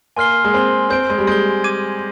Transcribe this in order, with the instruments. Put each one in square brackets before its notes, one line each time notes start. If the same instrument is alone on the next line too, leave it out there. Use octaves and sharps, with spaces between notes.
[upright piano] A#3 [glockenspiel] G#5 C6 F6 C7 G7
[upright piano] G#3
[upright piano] C4 [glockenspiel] G#5 C6 F6 C7 G7
[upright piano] C4 [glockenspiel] G6 D7 G7
[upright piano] G#3
G3
[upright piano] G#3 [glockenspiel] G6 D7 G7
[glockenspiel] D6 G#6 D#7